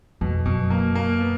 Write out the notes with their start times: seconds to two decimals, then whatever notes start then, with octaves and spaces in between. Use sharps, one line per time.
0.21 F2 B2
0.46 F#2 B2
0.70 A#3
0.95 A#3
1.21 B3